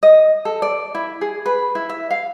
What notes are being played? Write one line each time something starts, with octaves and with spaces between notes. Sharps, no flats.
D#5
A4
D5
E4
G#4
B4
E4
E5
F5